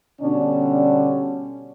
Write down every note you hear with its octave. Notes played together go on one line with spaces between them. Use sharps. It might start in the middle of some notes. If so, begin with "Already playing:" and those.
B2 D3 G3 C#4 D4